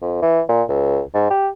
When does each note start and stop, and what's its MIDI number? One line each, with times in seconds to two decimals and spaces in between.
0.02 0.20 41
0.22 0.41 52
0.49 0.63 46
0.69 1.01 37
1.14 1.28 44
1.30 1.49 67